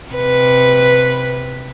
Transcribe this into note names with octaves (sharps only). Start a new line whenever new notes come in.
C3 B4